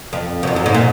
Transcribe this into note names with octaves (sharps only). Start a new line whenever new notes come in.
F2
F#2
F2
F#2
G#2
A#2